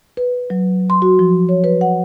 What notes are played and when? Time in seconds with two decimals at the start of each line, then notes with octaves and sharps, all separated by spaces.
0.17 B4
0.50 F#3
0.90 C6
1.02 F#4
1.19 F3
1.49 C#5
1.64 B4
1.81 F#5